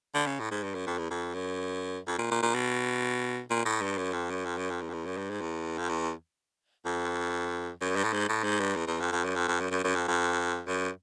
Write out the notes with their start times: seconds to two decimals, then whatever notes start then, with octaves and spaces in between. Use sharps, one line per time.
0.15 D3
0.27 C#3
0.40 A2
0.51 G#2
0.63 G2
0.74 F#2
0.87 F2
0.98 E2
1.10 F2
1.34 F#2
2.07 F2
2.18 A#2
2.31 A#2
2.43 A#2
2.54 B2
3.50 A#2
3.65 A2
3.81 G2
3.98 F#2
4.13 F2
4.30 F#2
4.45 F2
4.58 F#2
4.70 F2
4.81 E2
4.89 F2
4.94 E2
5.05 F#2
5.17 G2
5.30 G#2
5.41 E2
5.78 F2
5.90 E2
6.85 F2
7.81 F#2
7.96 G2
8.04 A2
8.13 G#2
8.29 A2
8.44 G#2
8.60 G2
8.76 E2
8.87 E2
9.00 F2
9.12 F2
9.24 F#2
9.36 F2
9.48 F2
9.60 F#2
9.71 F#2
9.84 F#2
9.95 F2
10.08 F2
10.67 F#2